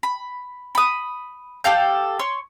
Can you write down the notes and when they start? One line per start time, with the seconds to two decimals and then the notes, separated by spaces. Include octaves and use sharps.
0.03 B5
0.75 B5 D#6
1.64 G4 A4 F5 G6
2.19 C#5 C6